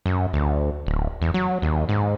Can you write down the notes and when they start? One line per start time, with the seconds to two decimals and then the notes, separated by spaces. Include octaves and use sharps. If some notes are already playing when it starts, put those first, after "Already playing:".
0.06 F#2
0.33 D2
0.87 D1
1.22 E2
1.34 F#3
1.62 D#2
1.89 G#2